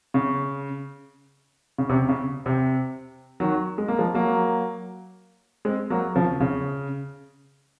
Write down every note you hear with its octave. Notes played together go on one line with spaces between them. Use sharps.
C#3
C#3
C3
C#3
C3
D#3 F#3
G#3
A#3
F3 G#3
F#3 A#3
G#3 C4
F#3 A#3
C#3 F3
C#3